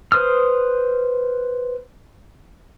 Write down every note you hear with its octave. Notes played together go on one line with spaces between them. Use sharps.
B4 C5 D#6 F6